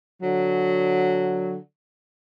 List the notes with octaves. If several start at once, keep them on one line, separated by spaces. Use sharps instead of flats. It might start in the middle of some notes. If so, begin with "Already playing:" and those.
D3 F#3